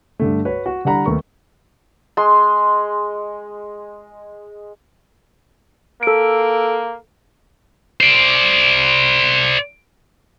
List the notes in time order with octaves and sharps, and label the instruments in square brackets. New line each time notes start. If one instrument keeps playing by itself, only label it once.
[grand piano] G2 D3 A3
F#4 B4 C#5
F#4
D3 G3 D5 F#5 A#5 B5
D#2 A3 B3 A#4 C#6
[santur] G#3 C6
[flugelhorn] A#3 [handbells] A4 D7
[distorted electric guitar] C5 D5